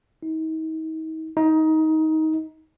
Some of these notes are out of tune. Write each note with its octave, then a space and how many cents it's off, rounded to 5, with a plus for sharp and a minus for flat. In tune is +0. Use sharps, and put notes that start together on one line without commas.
D#4 +40
D#4 +20